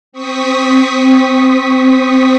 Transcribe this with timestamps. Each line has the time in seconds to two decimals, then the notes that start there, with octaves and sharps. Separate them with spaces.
0.12 C4 C#6 D#6 B6